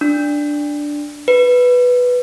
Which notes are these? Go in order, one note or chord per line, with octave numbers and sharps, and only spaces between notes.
D4
B4